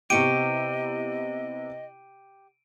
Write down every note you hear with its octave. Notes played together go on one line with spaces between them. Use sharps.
C3 B3 E4 G4 D#5 C#6 D7 D#7